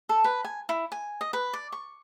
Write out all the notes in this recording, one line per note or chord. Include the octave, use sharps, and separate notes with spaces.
A4
B4
G#5
E4
G#5
D#5
B4
D5
C#6